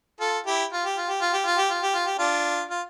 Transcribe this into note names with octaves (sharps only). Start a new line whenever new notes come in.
F4 A4
E4 G4
F4
G4
F4
G4
F4
G4
F4
G4
F4
G4
F4
G4
D4 F4
F4